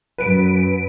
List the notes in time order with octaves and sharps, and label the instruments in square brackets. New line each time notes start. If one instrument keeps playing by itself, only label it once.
[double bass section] F#2 [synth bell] B4 D7